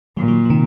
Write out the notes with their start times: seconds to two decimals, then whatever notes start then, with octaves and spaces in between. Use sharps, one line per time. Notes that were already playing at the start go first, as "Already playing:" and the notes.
0.17 A#2 D#3 F#3
0.28 D#3 F#3
0.45 F3
0.50 C3 D#3